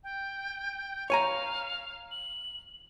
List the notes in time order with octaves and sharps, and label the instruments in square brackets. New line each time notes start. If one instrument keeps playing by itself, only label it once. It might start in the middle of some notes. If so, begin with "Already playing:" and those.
[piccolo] G5
[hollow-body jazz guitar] C#5 G#5 A#5 [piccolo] F5
[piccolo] F#7